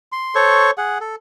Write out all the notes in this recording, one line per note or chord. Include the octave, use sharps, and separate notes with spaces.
C6
A4 C5 C#5 C#6
G#4 F#5
A4